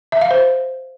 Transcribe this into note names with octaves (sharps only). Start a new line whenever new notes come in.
E5
F5
C5